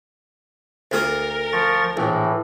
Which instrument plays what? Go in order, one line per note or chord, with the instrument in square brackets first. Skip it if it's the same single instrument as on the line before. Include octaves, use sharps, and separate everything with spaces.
[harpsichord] D2 F4 D#6 [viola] A#4
[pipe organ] F3 C#6 A6
[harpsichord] A#1 [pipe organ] A2 E3